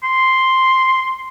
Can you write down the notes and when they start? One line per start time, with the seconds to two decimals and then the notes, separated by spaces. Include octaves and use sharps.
0.03 C6